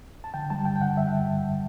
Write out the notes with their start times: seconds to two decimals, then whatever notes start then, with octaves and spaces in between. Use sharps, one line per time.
0.24 A5
0.34 D3 G5
0.50 G3 A5
0.65 G2 G5
0.76 G5
0.81 D3 F#5
0.97 G3 E5
1.14 G3
1.29 G2